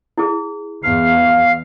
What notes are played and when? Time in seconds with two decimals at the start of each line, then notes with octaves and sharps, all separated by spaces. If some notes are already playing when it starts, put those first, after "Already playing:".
0.18 E4 G#4
0.83 E2 F5